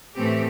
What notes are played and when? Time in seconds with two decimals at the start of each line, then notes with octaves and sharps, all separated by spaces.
0.15 A2 E3 A3 C4 G4